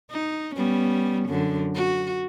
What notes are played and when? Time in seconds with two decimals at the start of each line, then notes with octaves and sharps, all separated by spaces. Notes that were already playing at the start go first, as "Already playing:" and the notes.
0.11 D#4
0.55 G3 B3 C#4
1.29 F#2 D3
1.75 F#4